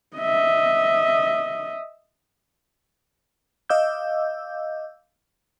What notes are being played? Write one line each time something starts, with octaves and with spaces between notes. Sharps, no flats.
D#5 E5
D#5 F5 D6 E6 G6